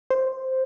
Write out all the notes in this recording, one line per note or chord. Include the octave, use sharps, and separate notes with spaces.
C5